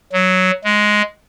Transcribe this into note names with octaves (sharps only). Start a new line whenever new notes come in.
F#3
G#3